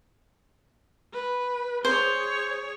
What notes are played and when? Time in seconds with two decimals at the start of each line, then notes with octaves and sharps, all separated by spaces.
1.14 B4
1.85 G#4 C5 C#5